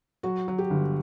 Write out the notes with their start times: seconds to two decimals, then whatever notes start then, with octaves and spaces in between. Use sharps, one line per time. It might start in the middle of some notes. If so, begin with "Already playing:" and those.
0.23 F#3 F#4
0.48 F#3
0.58 G4
0.70 G1